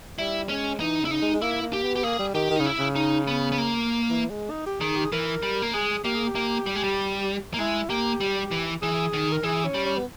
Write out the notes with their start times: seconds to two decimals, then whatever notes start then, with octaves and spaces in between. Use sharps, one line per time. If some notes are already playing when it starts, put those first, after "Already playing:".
0.18 G3 E4
0.49 G#3 C#4
0.80 E3 D#4
1.01 C#3 E4
1.11 D#4
1.22 G#3
1.34 G#3
1.42 A#3 E4
1.62 A#3
1.73 G4
1.83 B3
1.96 G4
2.03 A#3 G#4
2.19 G3
2.34 D#3 G4
2.50 D#3
2.56 C#3 D#4
2.66 E4
2.79 C#3
2.96 D#4
3.28 B3
3.52 B3
3.58 A#3
4.10 E3
4.30 G#3
4.50 D#4
4.66 G4
4.81 D#3 G#4
4.96 G4
5.05 G#4
5.12 E3 A#4
5.43 G3
5.62 A#3
5.74 G#3 G#4
6.04 A#3 G4
6.15 G#4
6.27 G4
6.35 A#3
6.66 G3
6.75 G#3
6.84 G3
7.54 A#3
7.58 G#3 E4
7.89 A#3 G4
8.21 G3
8.51 E3
8.82 E3 G#4
9.13 D#3
9.32 A#4
9.43 E3 G#4
9.65 C#4
9.74 G3
9.86 C#4
9.97 B3